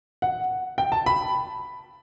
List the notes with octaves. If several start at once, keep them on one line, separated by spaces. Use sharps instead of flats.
F#5
G5
A5
B5